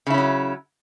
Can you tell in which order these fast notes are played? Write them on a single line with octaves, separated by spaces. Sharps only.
C#3 E4 C#4 F#3